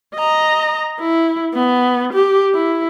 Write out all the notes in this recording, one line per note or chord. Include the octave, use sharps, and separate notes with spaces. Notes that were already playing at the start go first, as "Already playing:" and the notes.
D#5 A#5
E4
B3
G4
E4